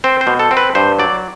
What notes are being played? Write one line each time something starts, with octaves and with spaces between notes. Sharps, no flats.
C4 C5
C5
B2
A4
C4
B4
G2 C5
F#3 D5